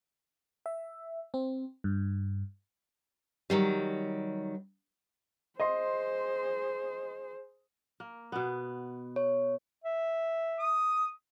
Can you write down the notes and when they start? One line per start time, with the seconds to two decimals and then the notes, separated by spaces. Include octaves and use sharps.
0.66 E5
1.34 C4
1.84 G2
3.50 D#3 F#3 G3
5.60 G#4 C5 D#5 C6
8.00 A#3
8.32 B2 B3
9.16 C#5
9.84 E5
10.59 D#6